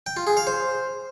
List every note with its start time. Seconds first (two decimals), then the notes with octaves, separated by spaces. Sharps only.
0.06 G5
0.17 F4
0.27 G#4
0.37 F5
0.47 C5